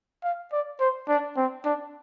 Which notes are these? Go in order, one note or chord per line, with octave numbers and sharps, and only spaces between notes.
F5
D5
C5
D4
C4
D4